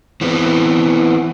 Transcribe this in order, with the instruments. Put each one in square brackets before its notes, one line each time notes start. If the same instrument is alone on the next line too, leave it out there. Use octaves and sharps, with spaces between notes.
[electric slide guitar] E3 B3 C4